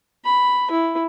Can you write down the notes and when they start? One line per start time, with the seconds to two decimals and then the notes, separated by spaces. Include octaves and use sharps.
0.25 B5
0.71 E4